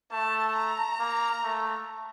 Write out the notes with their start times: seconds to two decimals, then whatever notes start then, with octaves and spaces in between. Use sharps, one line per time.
0.12 A3 A5
0.55 A#5
0.99 A#3
1.44 A3